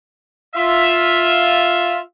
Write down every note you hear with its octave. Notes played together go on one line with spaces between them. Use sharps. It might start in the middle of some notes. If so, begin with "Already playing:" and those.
F4 E5